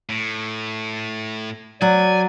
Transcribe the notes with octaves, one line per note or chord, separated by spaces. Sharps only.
A2
F#3 D5 G#5